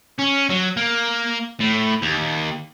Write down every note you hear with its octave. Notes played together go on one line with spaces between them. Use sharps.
C#4
F#3
A#3
A2
D#2